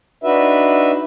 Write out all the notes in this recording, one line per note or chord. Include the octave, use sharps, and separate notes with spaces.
D4 D#4 F#4 B4 E5